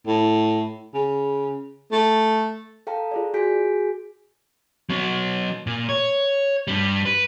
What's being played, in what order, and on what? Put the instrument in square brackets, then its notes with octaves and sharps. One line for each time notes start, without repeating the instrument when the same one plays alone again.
[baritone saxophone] A2
C#3
A3
[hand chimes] A4 F5 G5 A5 A#5
F4 G#4 D5
F#4 G#4 G#5 G6 B6 D7
[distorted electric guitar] F#3 B3
A#2
C#5
G2 G3
B4